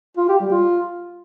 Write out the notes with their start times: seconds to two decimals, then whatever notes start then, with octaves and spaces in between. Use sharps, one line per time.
0.17 F4
0.29 G4
0.40 G3
0.51 F4